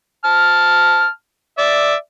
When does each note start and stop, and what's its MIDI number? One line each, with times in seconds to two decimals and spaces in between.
0.24 1.08 81
0.24 1.08 89
1.58 1.95 74
1.58 1.95 76